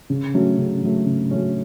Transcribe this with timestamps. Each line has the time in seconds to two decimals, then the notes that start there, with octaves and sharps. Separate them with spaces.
0.10 C#3
0.34 F#3 A3 C#4
0.58 C#3
0.83 F#3 A3 C#4
1.06 C#3
1.31 F#3 A3 C#4